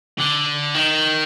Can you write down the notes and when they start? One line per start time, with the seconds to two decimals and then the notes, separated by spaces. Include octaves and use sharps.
0.18 D3
0.75 D#3